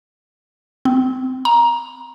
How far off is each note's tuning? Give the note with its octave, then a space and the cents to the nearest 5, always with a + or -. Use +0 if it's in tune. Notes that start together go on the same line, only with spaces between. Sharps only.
C4 -25
A#5 +15